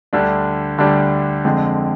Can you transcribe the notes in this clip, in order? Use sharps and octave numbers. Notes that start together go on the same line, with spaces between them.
D2 D3 G3 D4
D2 D3 G3 D4
F2 D3 G#3 C4